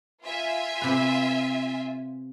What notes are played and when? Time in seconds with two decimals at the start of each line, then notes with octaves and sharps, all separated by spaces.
0.23 F4 E5 G#5
0.82 C3 B4